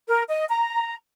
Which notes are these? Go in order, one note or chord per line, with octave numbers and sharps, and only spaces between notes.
A#4
D#5
A#5